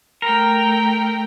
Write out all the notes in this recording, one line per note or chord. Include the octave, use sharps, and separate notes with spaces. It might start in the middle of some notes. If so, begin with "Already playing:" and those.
A3 A#4 G5